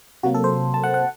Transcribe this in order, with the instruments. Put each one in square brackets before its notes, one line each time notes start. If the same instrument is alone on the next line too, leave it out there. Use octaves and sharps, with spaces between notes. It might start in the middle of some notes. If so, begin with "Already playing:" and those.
[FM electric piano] C3 F#3 A#3 F#4
A4
C5
A5
F#5
F#5